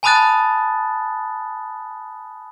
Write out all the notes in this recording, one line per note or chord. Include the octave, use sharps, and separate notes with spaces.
G#5 A5 B5 D#6 F#6 A6